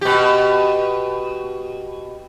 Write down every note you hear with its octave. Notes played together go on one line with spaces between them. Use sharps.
B2 G4